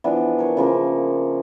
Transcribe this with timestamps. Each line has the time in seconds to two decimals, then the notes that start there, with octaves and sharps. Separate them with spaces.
0.04 E3 F3 B3 D4
0.39 A#4 C#5
0.57 C#3 F3 A#3